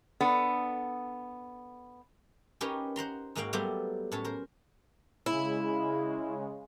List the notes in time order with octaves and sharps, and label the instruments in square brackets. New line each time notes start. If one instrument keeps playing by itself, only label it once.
[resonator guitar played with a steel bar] B3 D4 A4
[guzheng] C#4 D#4 G4 A#4 B4 C#5
C5 F#5 A#5 C6
G#2 G#3 A#3 F#4 F5 G5
F#3 G3 A3 B3 G4 C5
A2 C#4 C#5 A5
A#4 C5
[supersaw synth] C#3 G#3 [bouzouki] E4